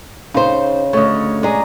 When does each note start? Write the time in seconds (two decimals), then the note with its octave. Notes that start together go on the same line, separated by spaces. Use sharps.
0.34 C#3 D#4 C5
0.93 D2 A3 C#5 D#5
1.43 G#3 G#4 D5 D#5 A#5